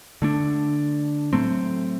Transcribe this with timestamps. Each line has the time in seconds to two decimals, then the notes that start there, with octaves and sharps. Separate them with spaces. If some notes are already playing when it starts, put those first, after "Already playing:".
0.22 D3 A3 D4
1.33 A2 F#3 A3 C4